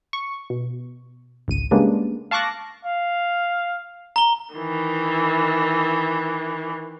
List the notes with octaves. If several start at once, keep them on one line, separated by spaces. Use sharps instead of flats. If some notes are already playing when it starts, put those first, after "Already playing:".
C#6
B2
G#1 C#2 D#7
C#3 G3 G#3 A#3 B3 D4
F5 A5 C#6 D6 F#6 A#6
F5
A#5 G7
D#3 E3